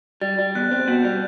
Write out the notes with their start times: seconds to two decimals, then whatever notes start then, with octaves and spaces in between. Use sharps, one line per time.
0.21 G3 A6
0.39 G3
0.55 E2 F#6
0.71 C4
0.88 B2 G6
1.04 G3